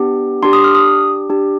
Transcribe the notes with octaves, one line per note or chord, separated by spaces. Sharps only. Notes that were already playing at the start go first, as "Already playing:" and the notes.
Already playing: B3 D4 G4
D4 G4 C6
D#6
F6
D#6
D4 G4